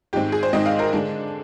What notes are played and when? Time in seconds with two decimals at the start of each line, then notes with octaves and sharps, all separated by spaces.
0.13 G#2 D#3 G#3 C4 G4
0.32 G#4
0.43 C5
0.53 G#2 D#3 G#3 C4 D#5
0.66 F5
0.79 A#4
0.93 D3 G#3 D4